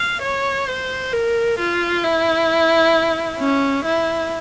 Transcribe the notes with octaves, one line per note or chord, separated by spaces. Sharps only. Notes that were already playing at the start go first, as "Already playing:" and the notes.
Already playing: F5
C#5
C5
A#4
F4
E4
C#4
E4